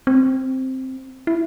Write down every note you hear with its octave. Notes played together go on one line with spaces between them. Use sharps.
C4
E4